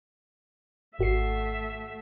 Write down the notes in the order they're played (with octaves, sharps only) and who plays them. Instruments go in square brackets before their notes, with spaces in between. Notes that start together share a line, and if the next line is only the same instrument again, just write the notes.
[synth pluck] G#1 F#4 C7 [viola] A3 E5